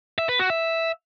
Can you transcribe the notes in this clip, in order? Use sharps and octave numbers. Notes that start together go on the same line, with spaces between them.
E5
B4
F#4
E5